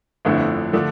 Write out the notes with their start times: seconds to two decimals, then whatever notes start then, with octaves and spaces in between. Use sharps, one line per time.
0.25 G1 F2 D3 A3 E4
0.73 D3 F3 A3 D4